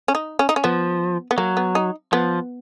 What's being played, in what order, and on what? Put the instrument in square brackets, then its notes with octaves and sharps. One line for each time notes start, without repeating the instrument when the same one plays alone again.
[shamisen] C#4
D#4
C#4
D#4
C#4
[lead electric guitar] F3 [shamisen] B3
[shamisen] B3
[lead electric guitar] F#3 [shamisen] A#3
[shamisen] B3
D#4
[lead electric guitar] F3 [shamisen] B3